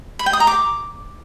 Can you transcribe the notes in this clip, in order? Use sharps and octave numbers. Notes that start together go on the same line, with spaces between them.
B5
G5
D#6
A#5
D6